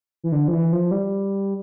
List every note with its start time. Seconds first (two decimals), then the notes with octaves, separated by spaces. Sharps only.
0.24 E3
0.32 D3
0.48 F3
0.52 E3
0.72 F3
0.91 G3